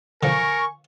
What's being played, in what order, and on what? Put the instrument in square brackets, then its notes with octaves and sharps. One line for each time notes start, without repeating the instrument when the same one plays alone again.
[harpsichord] D3 F3 [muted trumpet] A#4 [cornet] G#5 [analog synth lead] C#6